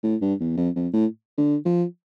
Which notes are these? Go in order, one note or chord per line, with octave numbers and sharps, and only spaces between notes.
A2
G2
E2
F2
F2
A2
D3
F3